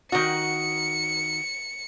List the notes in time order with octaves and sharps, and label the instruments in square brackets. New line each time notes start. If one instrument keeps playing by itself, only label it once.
[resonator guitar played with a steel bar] D#3 F#4 [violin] C#7